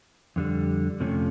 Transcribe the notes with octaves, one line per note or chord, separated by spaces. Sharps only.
F2 D3 G3
F2 C3 F3 A3 C#4